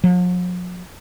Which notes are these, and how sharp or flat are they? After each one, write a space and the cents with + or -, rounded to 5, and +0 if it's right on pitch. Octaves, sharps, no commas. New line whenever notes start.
F3 +45